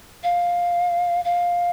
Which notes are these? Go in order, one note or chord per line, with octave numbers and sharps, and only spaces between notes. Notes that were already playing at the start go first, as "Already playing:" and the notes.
F5
F5